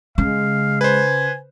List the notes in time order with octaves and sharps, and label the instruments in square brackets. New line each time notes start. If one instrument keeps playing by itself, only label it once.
[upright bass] C#3 [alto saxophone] G#3 [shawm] F5
[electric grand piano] B4 C5 [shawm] G#5